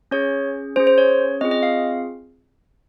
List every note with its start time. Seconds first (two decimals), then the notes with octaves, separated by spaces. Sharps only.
0.11 C#4 G#4 C#5
0.76 C#4 G#4 C5
0.87 C5
0.98 C#5
1.41 C4 F4 G#4 D#5
1.51 D#5
1.63 F5